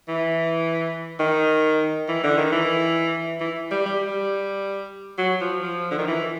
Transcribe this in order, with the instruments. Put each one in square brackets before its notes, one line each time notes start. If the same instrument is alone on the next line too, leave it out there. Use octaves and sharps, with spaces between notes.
[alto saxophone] E3
D#3
E3
D3
D#3
E3
E3
G3
G3
G3
F#3
F3
F3
D3
D#3
E3